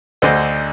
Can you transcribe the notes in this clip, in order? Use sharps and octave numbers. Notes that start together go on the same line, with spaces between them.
D2 D3 C5 D#5